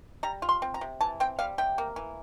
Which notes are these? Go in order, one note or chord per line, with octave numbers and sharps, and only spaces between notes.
G3 A#5
F4
C6
C4
A#5
C3
E3 A5
C4 G5
G3 F5
C3 G5
A#3
E3